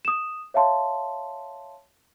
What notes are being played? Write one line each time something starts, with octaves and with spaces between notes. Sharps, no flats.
D#6 E7
C#5 E5 F5 A5 C6